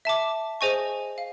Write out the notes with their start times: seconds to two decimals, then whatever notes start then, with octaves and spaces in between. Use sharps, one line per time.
0.05 E5 A5 D6
0.61 G#4 C5 D#5 G#5 C#6
1.18 F5